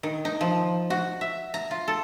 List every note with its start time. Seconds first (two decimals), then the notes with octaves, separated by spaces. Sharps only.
0.03 D#3
0.25 D#4
0.41 F3
0.90 F#4
1.21 E5
1.54 A#5
1.71 F4
1.88 A4